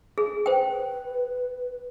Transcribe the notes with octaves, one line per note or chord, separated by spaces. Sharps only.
G#4
B4 C5 G5